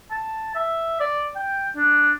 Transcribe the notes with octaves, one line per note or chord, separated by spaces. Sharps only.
A5
E5
D5
G5
D4